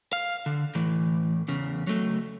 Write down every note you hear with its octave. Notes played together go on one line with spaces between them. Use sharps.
F5
D3
A2 E3
E2 C#3
F#3 A3